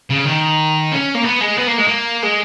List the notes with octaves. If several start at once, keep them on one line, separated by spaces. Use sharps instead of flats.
C#3
D#3
C#4
A#3
B3
G#3
B3
A#3
G#3
A#3
G#3